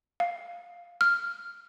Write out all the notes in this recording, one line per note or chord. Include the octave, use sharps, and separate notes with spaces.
F5
F6